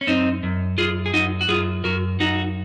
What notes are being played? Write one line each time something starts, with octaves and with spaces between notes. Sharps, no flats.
C#4
F#2 C4 D#4
F#2
F#2 F4 G#4
G#4
F#2 D#4 F#4
F#4
F#2 F4 G#4
F#2 F#4 A#4
F#2 D#4 F#4